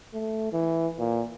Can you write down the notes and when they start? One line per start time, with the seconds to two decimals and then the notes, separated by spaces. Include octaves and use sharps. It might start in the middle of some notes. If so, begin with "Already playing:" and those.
0.14 A3
0.53 E3
0.99 A#2